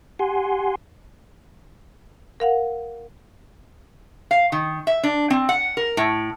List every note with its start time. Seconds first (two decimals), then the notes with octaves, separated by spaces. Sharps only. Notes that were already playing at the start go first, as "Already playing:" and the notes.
0.19 G4 F#5 G#5 C6
2.40 A#4 F5 F#5
4.31 F5
4.52 D#3
4.87 E5
5.03 D4
5.30 C4
5.49 F#5
5.77 A#4
5.97 A2